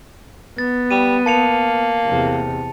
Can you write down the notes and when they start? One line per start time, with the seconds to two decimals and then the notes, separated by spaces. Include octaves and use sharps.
0.58 B3 A6
0.91 G3 D#7
1.26 A#3 A5 C#7 F7
2.06 E2 C3